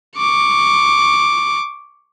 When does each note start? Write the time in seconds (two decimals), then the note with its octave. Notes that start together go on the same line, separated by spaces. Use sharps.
0.17 C#6 D6